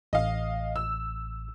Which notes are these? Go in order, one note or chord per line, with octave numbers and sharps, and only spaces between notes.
A1 D#5 F5
E6